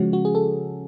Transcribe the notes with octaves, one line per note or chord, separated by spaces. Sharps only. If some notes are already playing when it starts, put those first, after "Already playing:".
Already playing: C#3 F3 G#3 C#4 F#4
F#4
G#4
A4